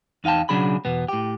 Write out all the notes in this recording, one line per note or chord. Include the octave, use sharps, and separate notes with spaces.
E2 D#4 F5 G5 A5
B1 C#3 F#3 D4 G#4 B5
E2 B2 B3
A2 G4